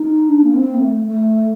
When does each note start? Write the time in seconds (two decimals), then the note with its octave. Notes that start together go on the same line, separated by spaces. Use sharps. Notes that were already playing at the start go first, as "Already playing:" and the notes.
Already playing: D#4
0.28 D4
0.43 A#3
0.53 C4
0.74 A#3
0.79 A3
1.05 A3